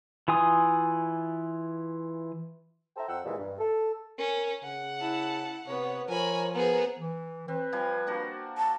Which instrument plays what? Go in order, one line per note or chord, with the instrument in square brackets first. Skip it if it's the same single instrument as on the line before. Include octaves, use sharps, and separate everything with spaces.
[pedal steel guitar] E3 F4 G#5 D#6
[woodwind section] A4 C5 E5 G5 A#5
F2 F3 F#5 G5 E6
A#2 D#3 E3 G3 G#3
G2
A4
[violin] C#4 [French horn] A#4
[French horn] C#3 [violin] F#5
[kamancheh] E4 A5
[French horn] C3 [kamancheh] B3 C#5
[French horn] F3 [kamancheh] A#4 C#5 [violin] G#5 B5
[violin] B3 G#4 [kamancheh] A#4 C5
[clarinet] E3
[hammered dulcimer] C4 [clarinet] B4
[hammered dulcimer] F3 G3 G#5
A#3 D4 F#4
[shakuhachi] A5